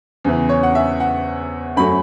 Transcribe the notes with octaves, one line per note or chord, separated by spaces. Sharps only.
E2 C#3 E3
C#5
F#5
E5
F#5
F#2 F#3 A3 C#4 B5